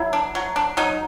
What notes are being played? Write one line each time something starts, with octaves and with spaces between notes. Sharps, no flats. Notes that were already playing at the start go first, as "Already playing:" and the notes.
Already playing: F#3 E4
D4
F#3
D4
F#3 D#4